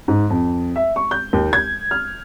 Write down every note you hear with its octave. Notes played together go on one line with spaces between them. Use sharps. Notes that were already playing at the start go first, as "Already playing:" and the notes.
G#2
F2
E5
C#6
G6
D#2
G#6
F6